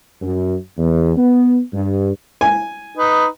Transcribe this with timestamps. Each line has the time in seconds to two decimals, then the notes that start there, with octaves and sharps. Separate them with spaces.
0.21 F#2
0.77 E2
1.17 B3
1.74 G2
2.41 G#5
2.98 D#4 B4